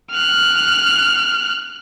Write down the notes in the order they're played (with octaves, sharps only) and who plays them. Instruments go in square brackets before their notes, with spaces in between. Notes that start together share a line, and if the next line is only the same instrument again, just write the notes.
[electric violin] F6 F#6